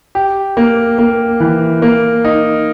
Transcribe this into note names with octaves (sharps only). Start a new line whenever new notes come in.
G4
A#3
A#3
E3
A#3
D#4